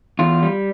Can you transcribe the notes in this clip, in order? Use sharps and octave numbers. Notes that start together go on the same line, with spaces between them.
E2 F4
G3